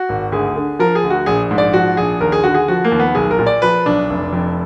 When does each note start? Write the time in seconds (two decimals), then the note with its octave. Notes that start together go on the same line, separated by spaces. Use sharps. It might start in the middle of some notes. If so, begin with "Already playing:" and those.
Already playing: F#4
0.09 G#1
0.32 D2 G#4
0.56 D3
0.79 F3 A#4
0.95 G#4
1.03 D2
1.10 F#4
1.26 A#1 G#4
1.51 G#2
1.58 D5
1.74 F3 F#4
1.97 A#1 G#4
2.21 D#2 A#4
2.32 G#4
2.44 D3 F#4
2.54 G#4
2.68 F3 F#4
2.84 A#3
2.92 D#2
3.00 B3
3.15 B1 G#4
3.31 A#4
3.39 A#2
3.47 D5
3.62 F3 B4
3.86 B1 D4
4.10 F1
4.33 F2